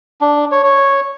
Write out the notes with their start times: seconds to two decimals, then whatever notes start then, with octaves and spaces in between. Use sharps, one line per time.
0.21 D4
0.52 C#5
0.63 C#5